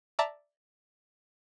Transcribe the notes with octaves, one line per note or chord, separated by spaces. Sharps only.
D5 E5 A5 A#5 D6